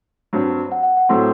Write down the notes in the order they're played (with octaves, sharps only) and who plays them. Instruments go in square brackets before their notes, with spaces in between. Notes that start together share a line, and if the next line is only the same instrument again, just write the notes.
[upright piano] G2 F#3 C4
[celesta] F#5
F#5
F#5
[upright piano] A2 F#3 A3 C4 [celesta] C6